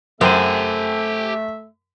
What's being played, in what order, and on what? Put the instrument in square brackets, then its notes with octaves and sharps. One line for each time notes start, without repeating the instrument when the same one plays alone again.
[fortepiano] F#2 [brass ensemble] A3 E5 [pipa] C4 [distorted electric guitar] G4 G#5